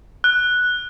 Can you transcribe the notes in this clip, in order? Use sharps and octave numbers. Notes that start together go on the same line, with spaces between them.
F#6